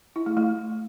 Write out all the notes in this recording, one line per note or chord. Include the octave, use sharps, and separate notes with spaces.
E4
A3
A3